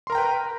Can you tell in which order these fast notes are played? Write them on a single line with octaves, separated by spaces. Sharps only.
C6 A#4 A#5 G5 B4